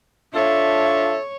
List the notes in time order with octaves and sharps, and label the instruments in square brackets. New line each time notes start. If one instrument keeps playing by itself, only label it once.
[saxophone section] D4 F4 A4 [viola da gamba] C#5 [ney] E5